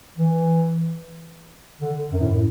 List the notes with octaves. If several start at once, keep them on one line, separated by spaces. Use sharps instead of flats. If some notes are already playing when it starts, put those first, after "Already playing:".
E3
D3
F#2
A2